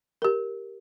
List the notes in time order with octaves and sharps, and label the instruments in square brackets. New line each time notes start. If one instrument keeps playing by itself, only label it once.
[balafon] G4 A#4